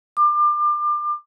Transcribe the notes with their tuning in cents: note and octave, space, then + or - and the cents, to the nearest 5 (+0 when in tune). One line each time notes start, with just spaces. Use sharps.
D6 +30